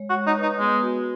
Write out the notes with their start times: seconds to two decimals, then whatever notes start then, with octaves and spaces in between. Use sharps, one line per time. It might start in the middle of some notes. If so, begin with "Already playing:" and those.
Already playing: G#3 C#5
0.10 F#4
0.15 G#3
0.27 D#4
0.37 B4
0.43 D#4
0.59 G#3 B3
0.82 F#4